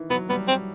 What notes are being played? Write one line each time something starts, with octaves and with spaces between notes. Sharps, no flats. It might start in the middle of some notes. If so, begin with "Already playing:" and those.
Already playing: D#3 E3
F#3 B3
G3 B3
C4